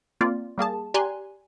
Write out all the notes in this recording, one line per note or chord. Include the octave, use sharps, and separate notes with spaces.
A#3 C4 F4 D5
G3 A#3 G#4 A5
G4 D5 G#5 A#5 C6 F#6